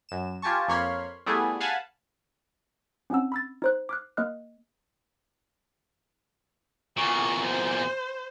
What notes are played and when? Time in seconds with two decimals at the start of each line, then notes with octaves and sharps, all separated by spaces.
0.09 F#2 E7
0.42 F4 G4 G#5 A5 C#6
0.68 F2 A#3 C#5 B5 C6 F6
1.26 G3 A3 B3 E4 G#4
1.60 F5 F#5 G#5 A5 B5
3.10 C4 C#4 D#4 F#5 E6
3.32 B5 E6 A6
3.62 D#4 C5 F#6
3.89 D6 F6 F#6
4.17 A#3 D#5 F6 F#6
6.97 E2 A#2 C#6
7.46 C5